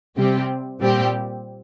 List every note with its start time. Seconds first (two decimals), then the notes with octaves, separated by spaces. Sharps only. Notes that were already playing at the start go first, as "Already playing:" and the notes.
0.17 C3 G3 C4 G4
0.80 A#2 G3 C4 G4